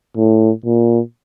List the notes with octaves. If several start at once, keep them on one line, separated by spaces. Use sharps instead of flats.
A2
A#2